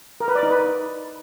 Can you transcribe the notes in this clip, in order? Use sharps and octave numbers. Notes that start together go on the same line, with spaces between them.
A#4
B4
D5
D#4
B4